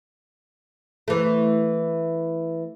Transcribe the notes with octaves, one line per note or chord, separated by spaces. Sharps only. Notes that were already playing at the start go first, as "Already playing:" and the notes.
E3 A3